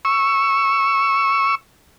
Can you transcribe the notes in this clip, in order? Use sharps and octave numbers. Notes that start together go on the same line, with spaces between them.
C#6 E6